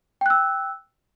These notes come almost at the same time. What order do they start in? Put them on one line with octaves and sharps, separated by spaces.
G5 F#6 E6